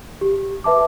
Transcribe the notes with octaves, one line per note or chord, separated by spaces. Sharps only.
G4
B4 E5 A5 D6